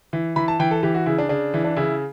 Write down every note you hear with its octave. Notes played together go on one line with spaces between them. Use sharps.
E3
E3 B5
A5
E3 G5
A4
E3 G4
F#4
C#3 E4
D4
C#3 D4
E3
D4
C#3 E4